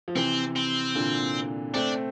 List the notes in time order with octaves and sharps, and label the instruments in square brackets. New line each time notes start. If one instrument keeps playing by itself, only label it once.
[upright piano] F3
[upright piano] C3 E3 [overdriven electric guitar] C4
[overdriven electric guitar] C4
[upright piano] A#2 D3
[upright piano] A3 C4 [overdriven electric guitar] D4